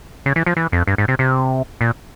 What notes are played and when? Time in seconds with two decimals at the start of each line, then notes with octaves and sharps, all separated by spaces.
0.26 C#3
0.36 E3
0.46 F3
0.57 E3
0.72 F2
0.87 G2
0.98 G#2
1.08 C3
1.19 C3
1.81 A#2